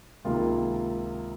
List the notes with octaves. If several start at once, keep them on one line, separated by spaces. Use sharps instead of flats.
C#2 C3 D#3 A#3 F4